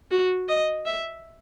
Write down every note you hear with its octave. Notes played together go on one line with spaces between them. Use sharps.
F#4
D#5
E5